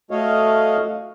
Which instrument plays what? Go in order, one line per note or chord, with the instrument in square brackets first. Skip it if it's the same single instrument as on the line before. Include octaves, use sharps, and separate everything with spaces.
[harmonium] A3 F#4 C#5 D#5 F5